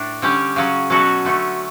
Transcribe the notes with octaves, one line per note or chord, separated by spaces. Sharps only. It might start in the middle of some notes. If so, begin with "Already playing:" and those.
Already playing: A2 D4
D3 G3 C#4 G4
C#3 F#3 C#4
B2 F#3 C#4 F#4 A4
D3 A3 C#4